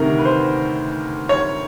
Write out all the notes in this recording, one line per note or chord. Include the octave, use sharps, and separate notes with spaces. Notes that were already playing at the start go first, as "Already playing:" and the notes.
Already playing: D2 C3 D#3 A#4
B4
C5
C#5